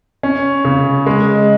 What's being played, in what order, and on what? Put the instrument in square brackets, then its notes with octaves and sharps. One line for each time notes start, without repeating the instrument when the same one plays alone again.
[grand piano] C#4
C#3
G#3